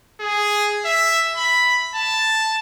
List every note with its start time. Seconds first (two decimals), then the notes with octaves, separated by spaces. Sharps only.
0.21 G#4
0.85 E5
1.37 B5
1.95 A5